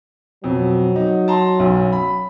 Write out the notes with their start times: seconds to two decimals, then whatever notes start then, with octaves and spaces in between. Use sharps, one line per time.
0.44 F2 B2 F#3
0.96 D#4
1.28 A5 A#5 C6
1.59 B1 F#2
1.93 B5